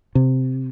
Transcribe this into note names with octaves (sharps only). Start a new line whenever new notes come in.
C3